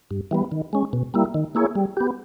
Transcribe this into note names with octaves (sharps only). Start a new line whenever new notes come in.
G2
E3 G3 B3
D#3
G#3 C#4
B2
G3 A#3 E4
D#3
A#3 E4 G#4 C#5
G3
B3 G4